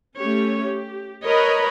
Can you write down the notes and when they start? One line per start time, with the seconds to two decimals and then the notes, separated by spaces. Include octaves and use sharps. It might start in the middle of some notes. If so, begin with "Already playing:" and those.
0.18 A3 C#4 G4 C#5
0.62 G4
1.25 A#4 B4 C#5 D#5 A#5 B5